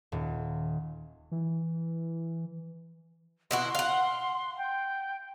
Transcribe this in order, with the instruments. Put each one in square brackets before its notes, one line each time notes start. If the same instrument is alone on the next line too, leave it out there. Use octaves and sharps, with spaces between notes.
[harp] D#1
[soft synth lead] E3
[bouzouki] B2 E4 F#4 [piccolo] C6
[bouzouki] F5 F#5
[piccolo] G5